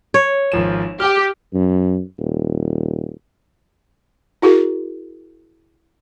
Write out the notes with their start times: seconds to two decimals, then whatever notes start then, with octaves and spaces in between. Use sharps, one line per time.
0.14 C#5
0.52 G#1 F3 E7
1.00 G4 G5 F6
1.54 F#2
2.19 D#1
4.42 E4 F#4 G#4 A#4